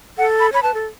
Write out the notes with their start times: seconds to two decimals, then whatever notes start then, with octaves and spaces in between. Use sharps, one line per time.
0.18 A4 F#5
0.40 B5
0.52 C#5 B5
0.63 B4 A5
0.74 A4